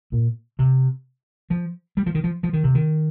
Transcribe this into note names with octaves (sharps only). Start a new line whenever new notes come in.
A#2
C3
F3
G3
F3
D#3
F3
F3
D#3
C3
D#3